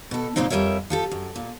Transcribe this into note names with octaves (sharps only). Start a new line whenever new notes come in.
B2 A4
A#2 C#3 G#3 C4 D#4
F2 G3 A#4 C#5 E5
F3 G4 A4
F#2
A#2